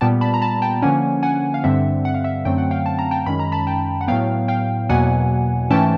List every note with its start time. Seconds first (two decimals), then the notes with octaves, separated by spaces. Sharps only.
0.01 A#2 G3 B3 G5 A5
0.21 A5 B5
0.34 A#5
0.42 A5 B5
0.62 G5 A5
0.82 D3 F3 A#3 C#4 F#5 G#5
1.23 F#5 G#5
1.54 F5
1.64 G2 D3 G3 C4 E5 F#5
2.05 F#5
2.14 F5
2.24 E5 F#5
2.45 F#2 D3 F#3 A3 C4 G5
2.58 F#5
2.71 F5 G5
2.86 A5
2.99 A#5
3.11 G5 A5
3.26 F#2 D#3 G#3 C#4 B5
3.39 A#5
3.52 A5 B5
3.67 G5 A5
4.01 F#5
4.08 A2 F#3 B3 F5 G5
4.48 F5 G5
4.89 E2 B2 F#3 A#3 F#5 G#5
5.70 G#2 E3 A3 C#4 G5 A5